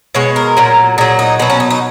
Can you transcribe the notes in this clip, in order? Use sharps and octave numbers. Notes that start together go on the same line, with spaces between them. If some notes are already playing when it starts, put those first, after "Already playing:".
B2 G#3 C#5
A#4
A#2 F#3
A#2 F#3 G#4
D#4
B2 F#3 B3
C#4
D#4
D#4